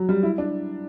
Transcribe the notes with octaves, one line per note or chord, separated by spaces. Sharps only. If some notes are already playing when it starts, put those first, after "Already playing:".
Already playing: F#3
G3
E4
D4